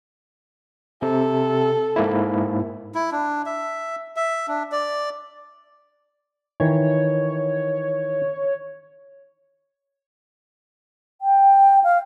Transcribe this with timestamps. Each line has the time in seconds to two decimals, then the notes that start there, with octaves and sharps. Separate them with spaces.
1.02 C3 A4
1.96 G#2 A#3 E4
2.95 E4
3.12 D4
3.46 E5
4.16 E5
4.48 D4
4.72 D5
6.60 D#3 E3 C#5
11.21 G5
11.84 F5